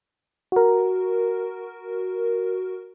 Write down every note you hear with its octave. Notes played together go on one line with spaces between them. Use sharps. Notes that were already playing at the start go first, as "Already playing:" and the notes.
F#4 A#4